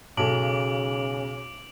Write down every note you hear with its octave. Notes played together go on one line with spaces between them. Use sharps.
B1 C#3 A4 C#5 A5 D6 D7 F#7